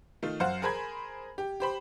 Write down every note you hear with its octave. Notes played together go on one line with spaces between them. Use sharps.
D#3 A3 F4
F#2 C5 F5 F#5
G#4 A#4 C5 G#5 B5 G#6
G4
G4 C5 B5